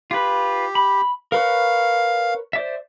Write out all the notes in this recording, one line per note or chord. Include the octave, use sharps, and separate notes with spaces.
F4 G4 B4
B5
A#4 B4 C#5 F5
C5 D5 E5